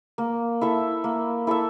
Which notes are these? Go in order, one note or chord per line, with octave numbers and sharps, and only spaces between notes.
A#3
E4 A4 E5
A#3
E4 A4 E5